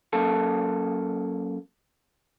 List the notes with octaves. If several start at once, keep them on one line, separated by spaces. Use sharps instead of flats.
F#2 A#3 A4